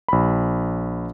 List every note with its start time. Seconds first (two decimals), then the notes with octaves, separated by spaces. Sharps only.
0.08 A#1 B5